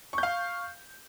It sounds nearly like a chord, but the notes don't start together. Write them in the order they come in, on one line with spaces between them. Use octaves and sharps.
C#6 G6 F5